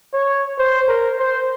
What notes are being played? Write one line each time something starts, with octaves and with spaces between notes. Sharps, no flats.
C#5
C5
A#4
C5